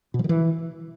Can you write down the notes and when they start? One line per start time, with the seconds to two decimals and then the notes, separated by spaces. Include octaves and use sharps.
0.14 B2
0.19 F3
0.24 D#3
0.29 E3